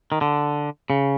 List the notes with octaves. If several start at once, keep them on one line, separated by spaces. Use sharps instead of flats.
D#3
D3
C#3